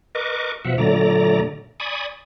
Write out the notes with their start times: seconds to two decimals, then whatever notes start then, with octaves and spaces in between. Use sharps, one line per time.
0.15 A#4 B4 D#5 C#6 D6
0.65 B2 F3 E5 F#5
0.78 A#2 D3 F#3 A3 D5 A#5
1.80 D5 G#5 B5 C#6 D#6